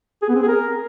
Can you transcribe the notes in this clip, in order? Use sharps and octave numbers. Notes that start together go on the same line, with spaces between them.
G#4
B3
C4
G#4
A#4